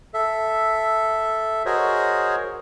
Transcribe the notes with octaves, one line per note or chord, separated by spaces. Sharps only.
A4 E5
F#4 G#4 A#4 C5 C#5 D#5